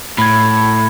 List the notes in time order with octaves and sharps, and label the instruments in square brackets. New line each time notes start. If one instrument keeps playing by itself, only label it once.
[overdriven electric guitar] A2 [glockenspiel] B5 G#6